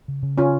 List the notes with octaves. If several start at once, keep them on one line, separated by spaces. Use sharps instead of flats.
C#3
C#3
C#3 C#4 F4